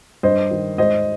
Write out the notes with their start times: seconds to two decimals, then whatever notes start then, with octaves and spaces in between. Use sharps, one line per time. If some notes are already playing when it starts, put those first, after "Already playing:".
0.23 G2 C5 D#5
0.51 D#3
0.78 G#2 C5 D#5